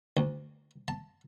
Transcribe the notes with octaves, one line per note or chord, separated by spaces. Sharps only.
D2
A5